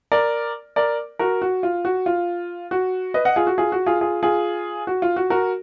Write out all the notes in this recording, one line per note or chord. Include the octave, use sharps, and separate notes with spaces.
A#4 D5
A#4 D5
F#4 A#4
F#4
F4
F#4
F4
F#4
B4 D#5
D#5 F#5
F4 G#4
F#4
F4 G#4
F#4
F4 G#4
F4 G#4
F4 G#4
F#4
F4
F#4
F#4 A#4